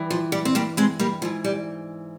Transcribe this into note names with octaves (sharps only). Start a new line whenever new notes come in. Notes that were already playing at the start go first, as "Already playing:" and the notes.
Already playing: G2 E3
F3
G3
C4
G3 A#3
G#3 C4
G3 A#3
G#2 E3 F3
G3